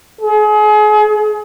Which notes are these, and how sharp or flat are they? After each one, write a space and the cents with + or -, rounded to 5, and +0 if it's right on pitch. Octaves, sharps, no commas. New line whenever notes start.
G#4 +35